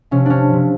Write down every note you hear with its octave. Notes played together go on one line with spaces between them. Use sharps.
C3 F3 C#4
C#4 D4
C3 F3